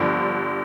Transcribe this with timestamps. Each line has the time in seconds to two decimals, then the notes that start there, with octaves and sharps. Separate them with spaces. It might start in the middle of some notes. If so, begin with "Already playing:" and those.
Already playing: G1 G2 D3 F3